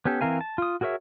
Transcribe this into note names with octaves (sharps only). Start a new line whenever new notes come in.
B3 C#4 G4 A4
E3 C4 A#4 F5 G#5
A5
F4 D#6
F#4 G#4 A#4 C#5 E5